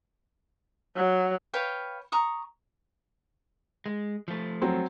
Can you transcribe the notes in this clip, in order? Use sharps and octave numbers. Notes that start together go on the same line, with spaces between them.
F#3
B4 C#5 F5 G5
A#5 C#6 D#6
G#3
F3 A3
F#3 C4